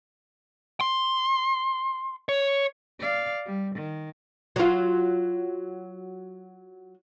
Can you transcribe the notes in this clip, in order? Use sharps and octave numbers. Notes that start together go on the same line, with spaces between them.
C6
C#5
D5 F5
G3
D#3
F#3 F4